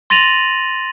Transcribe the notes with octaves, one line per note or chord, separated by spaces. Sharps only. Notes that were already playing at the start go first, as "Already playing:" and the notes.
C6 A6 A#6 D#7 F7 F#7